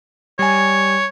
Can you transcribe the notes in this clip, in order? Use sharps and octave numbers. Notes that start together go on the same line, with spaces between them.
G3 C#5 G#5